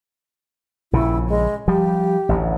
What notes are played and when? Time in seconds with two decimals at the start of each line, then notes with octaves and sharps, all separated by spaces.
0.93 A#1 C#3 E4
1.29 G#3
1.68 F3 G3 G4
2.29 A1 D2